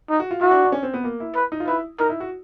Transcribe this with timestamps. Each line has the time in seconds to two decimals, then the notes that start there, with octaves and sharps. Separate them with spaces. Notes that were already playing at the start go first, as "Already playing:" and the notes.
0.10 D#4
0.20 F#4
0.31 F4
0.41 E4 F#4
0.51 D4
0.65 D4
0.72 C#4
0.83 C4
0.94 B3
1.04 A#3
1.20 E4
1.36 B4
1.52 D#4
1.60 F4
1.68 E4 B4
2.00 D#4 A#4
2.09 E4
2.20 F#4